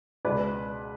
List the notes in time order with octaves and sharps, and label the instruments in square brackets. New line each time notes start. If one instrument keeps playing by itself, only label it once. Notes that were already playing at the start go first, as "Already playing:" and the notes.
[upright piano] C#2 B2 B4 D5